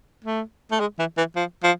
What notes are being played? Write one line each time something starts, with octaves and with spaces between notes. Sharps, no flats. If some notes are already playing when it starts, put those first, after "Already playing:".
A3
A3
G#3
E3
E3
F3
F3